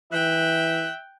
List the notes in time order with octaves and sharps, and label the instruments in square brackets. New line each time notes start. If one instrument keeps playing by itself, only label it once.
[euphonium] E3 [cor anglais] E5 [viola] G5 [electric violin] F#6